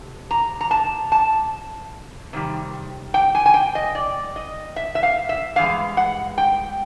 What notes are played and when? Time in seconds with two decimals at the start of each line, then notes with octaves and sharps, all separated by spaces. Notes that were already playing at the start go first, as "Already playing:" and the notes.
Already playing: F2 C3
0.31 A#5
0.61 A#5
0.71 A5
1.12 A5
2.33 C3 D#3 G3
3.14 G5
3.35 G#5
3.46 G#5
3.54 G5
3.75 D#5
3.95 D5
4.36 D#5
4.76 E5
4.95 E5
5.03 F5
5.29 E5
5.56 G2 E3 G#3 F5
5.97 F#5
6.38 G5